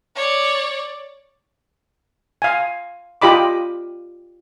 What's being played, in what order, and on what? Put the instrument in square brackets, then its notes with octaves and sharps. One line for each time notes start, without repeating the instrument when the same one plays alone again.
[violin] C#5 D5
[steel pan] F5 G#5
F4 G4 D#5 B5 D6